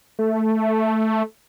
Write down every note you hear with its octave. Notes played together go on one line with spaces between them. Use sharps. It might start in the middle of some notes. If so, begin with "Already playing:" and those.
A3